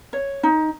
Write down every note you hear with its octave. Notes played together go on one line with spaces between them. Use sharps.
C#5
D#4